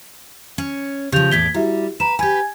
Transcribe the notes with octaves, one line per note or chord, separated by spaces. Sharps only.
C#4
C#3 F3 G4 G6 F7
E2 A2 D5 G#6 B6 G7
G3 E4 F#4 E5
B4 A#5 E7
G4 B4 G#5 G#6